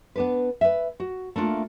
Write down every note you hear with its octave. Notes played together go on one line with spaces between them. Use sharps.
B3 D4 B4
B4 E5
F#4
A3 A#3 D4 F4